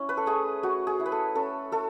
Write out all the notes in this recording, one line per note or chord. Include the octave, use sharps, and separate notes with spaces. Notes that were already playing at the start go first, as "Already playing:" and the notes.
Already playing: C#4 E4
B4
A4
A3 G#4
A3 F#4
G#4
E4
B4
A4
C#4 A4
A3 A4